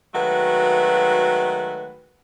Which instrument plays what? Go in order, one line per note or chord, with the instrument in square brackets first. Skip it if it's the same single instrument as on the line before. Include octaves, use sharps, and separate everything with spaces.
[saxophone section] D#3 F#3 G#3 A3 F#4 B4